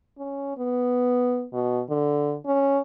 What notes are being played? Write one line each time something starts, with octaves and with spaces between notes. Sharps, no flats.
C#4
B3
B2
D3
C#4